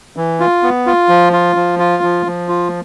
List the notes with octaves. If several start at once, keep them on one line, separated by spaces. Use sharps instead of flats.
E3
F4
B3
F4
F3
F4
F3
F4
F3
F3
F4